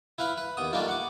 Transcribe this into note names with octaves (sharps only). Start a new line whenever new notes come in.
E4 B4 F5 B5 C6
B4
D#2 B3 D#6
G3 A3 A#3 D4 D#4 F4
F#5 D6